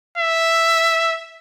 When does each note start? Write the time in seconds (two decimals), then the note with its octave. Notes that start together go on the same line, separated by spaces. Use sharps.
0.18 E5